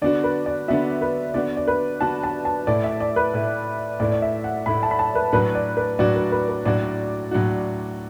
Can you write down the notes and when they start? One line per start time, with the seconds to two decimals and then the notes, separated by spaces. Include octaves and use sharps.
0.02 D3 B3 D4 F#4 D5
0.24 B4
0.46 D5
0.68 D3 B3 D4 F#4 E5
1.01 B4
1.34 D3 B3 D4 F#4 D5
1.57 D5
1.67 B4
2.01 D3 B3 D4 F#4 A5
2.24 A5
2.45 A5
2.67 A2 A3 E4 D5
2.84 E5
3.00 D5
3.16 B4
3.34 A2 A3 E4
4.00 A2 A3 E4 D5
4.12 D5
4.22 E5
4.44 F#5
4.66 A2 A3 E4 B5
4.83 A5
4.91 B5
4.99 A5
5.15 B4
5.33 A2 F#3 D4 F#4 B4
5.55 D5
5.77 B4
5.99 A2 F#3 D4 F#4 D5
6.15 B4
6.32 B4
6.48 B4
6.65 A2 F#3 D4 F#4 D5
7.31 A2 F#3 D4 F#4